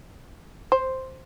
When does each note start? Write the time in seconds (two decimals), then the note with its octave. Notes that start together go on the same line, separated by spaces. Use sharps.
0.72 C5